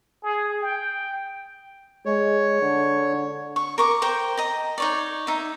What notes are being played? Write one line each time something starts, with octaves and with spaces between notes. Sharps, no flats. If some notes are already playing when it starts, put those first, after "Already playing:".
G#4
G5
G#3 C#5
D3
C#6
A#4 C#6 D6
A#4 C5 G5
D#5 A#5
D#4 C#5 D5
D#4 E5